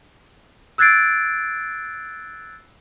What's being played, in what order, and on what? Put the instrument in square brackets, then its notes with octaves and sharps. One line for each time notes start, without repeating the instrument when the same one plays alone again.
[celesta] E6 F#6 G#6 A6 C7 D7